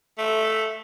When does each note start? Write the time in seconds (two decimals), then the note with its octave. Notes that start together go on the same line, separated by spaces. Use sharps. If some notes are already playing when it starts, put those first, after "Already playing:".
0.18 A3